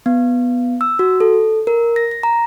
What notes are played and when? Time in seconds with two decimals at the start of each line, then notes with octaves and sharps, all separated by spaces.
0.06 B3
0.81 E6
0.99 F#4
1.20 A4
1.67 A#4
1.96 A#6
2.11 A#6
2.23 A#5